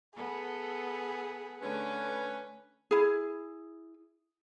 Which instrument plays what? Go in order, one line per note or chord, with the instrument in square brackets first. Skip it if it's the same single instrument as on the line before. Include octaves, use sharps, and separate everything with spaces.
[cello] B3 [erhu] G#4 [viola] A4
[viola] D3 A3 [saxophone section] C#4 B4
[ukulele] E4 G#4